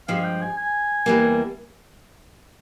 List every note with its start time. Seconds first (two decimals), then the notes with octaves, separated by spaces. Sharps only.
0.08 G2 F3 G#3 F5
0.24 G5
0.42 G#5
0.57 G#5
1.06 E2 E3 G3 A#3